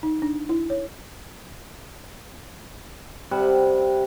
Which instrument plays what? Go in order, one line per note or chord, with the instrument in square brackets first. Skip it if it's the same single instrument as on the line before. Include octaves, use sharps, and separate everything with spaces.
[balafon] D#4
D4
E4
C#5
[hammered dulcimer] C3 G3 F#5